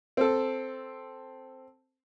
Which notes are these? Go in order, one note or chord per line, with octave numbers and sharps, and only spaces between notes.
C4 A4